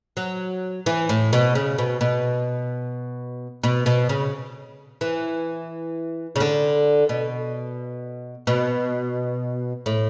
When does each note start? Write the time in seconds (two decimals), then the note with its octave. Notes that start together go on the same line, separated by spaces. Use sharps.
0.17 F#3
0.86 E3
1.09 A2
1.33 B2
1.55 C#3
1.78 B2
2.01 B2
3.64 B2
3.86 B2
4.09 C#3
5.01 E3
6.36 C#3
6.40 D3
7.09 B2
8.47 B2
9.86 A2